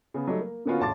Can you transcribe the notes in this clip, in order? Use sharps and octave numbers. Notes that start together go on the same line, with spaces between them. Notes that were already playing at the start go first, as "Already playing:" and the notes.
C#3 B3
F#3 G3 A3 D#4
A#3
D3 A#3 B3 C#4 F4 F#4
E1 A1 A5 C6 D6 A6